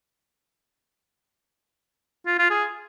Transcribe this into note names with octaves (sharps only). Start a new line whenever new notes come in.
F4
F4
G#4